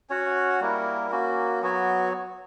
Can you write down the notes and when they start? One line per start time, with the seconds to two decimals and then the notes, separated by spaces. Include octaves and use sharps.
0.10 C#4 F#4 C#5 F#5
0.60 G3 A#3 E4 A#4
1.11 A#3 C#4 F#4
1.62 F#3 B3 F#4 C#5